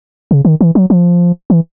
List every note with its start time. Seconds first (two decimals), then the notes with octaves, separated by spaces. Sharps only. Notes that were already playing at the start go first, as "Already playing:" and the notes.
0.31 C#3
0.45 D#3
0.61 E3
0.75 F#3
0.90 F3
1.50 E3